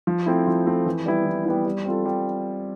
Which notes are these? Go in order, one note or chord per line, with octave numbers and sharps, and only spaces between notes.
F3
A3 C4 E4
F3
A3 C4 E4
E3
G3 B3 E4
E3
G3 B3 E4
G3
C4 F4 A4
G3